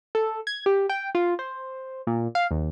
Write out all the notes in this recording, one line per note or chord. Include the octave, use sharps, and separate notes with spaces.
A4
G#6
G4
G5
F4
C5
A#2
F5
D#2